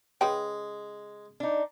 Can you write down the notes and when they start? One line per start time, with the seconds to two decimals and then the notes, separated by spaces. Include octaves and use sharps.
0.21 C#3 G#3 B4 G5
1.40 D4 D#4